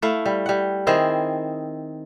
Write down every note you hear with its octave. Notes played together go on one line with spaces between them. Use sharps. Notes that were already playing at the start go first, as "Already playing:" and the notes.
A3 E4 F5
G3
G3 F#5
D#3 C4 E4 G#4